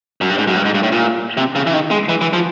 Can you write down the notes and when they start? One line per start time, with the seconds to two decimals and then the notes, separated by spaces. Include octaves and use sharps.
0.21 F#2
0.30 G2
0.38 G#2
0.47 F#2
0.56 G2
0.65 G#2
0.74 G2
0.83 A2
0.92 A#2
1.37 C3
1.55 C#3
1.67 E3
1.73 D#3
1.91 G#3
2.09 E3
2.21 E3
2.33 F3